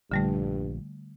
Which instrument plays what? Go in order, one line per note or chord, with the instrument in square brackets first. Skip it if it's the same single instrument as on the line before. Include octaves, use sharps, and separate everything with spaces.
[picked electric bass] A#1 [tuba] G2 [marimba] D3 G3 A3